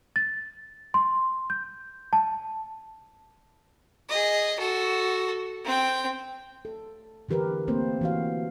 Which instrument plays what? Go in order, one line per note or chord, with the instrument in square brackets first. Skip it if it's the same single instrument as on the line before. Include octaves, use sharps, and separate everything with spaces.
[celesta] A6
C6
G6
A5
[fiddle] G#4 D#5
F#4 A4
C4 G5
[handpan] A4
D3 E3 G4 A#4 B4
A3 A#3 C4 C5
E3 F#4 F5